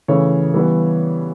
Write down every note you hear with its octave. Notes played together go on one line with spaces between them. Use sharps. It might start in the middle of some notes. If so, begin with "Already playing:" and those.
C#3 E3 A3 C#4 C#5
E3 G3 B3